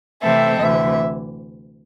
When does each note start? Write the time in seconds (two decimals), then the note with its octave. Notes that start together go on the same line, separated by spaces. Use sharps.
0.23 C3 E3 A3 C4 A4 E5
0.59 D2 C3 E3 E5